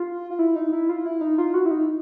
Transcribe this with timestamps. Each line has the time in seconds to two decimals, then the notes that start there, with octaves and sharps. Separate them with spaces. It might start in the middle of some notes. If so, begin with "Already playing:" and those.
Already playing: F4
0.30 F4
0.39 E4
0.55 D#4
0.73 E4
0.89 F4
1.05 E4
1.21 D#4
1.38 F4
1.54 F#4
1.66 E4
1.71 D#4